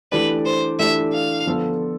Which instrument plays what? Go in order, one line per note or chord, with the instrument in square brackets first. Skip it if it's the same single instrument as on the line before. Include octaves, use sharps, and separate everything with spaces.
[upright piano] E3 A3 D4 G4 D5 [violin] B4
[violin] C5
[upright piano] E3 A3 D4 G4 D5 [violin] E5
[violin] F5
[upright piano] D3 F3 B3 F4 A4